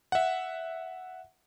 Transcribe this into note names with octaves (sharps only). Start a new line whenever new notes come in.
E5 F#5